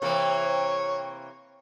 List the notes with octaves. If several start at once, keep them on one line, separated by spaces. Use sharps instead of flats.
C3 E3 A#3 C#5